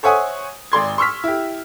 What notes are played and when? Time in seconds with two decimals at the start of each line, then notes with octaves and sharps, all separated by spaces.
0.03 C5 C#5 E5 F#5 G#5 D#6
0.72 G#1 D5 C6 G#6
0.98 C6 C#6 E6 F6 B6
1.24 E4 G4